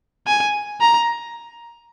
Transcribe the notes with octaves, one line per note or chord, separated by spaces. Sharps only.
G#5
A#5